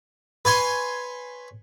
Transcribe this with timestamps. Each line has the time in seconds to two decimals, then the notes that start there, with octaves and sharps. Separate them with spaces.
0.45 B4 C#5 G#5 C6